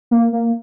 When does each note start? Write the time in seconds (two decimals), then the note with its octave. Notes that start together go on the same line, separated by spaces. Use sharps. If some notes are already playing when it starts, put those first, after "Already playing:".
0.11 A#3
0.33 A#3